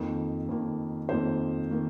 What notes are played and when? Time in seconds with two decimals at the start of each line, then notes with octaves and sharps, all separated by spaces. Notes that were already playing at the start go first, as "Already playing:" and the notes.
Already playing: F2 D#3 A#3
0.49 F2 D#3 A#3
1.09 F2 D#3 A#3 C5
1.71 D#3 A#3